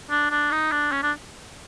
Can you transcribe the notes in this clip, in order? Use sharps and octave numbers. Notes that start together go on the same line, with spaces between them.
D4
D4
D#4
D4
C#4
D4